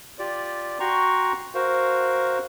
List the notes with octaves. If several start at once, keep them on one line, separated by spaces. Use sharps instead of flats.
F4 G4 D5
F#4 G5 A#5 C6 C#6
F#4 A#4 C5 F5